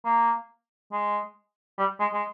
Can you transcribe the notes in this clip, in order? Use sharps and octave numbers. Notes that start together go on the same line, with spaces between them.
A#3
G#3
G3
G#3
G#3